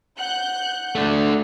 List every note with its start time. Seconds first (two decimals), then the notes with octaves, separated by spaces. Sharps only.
0.19 F#5 F#6 G6
0.95 A3 D4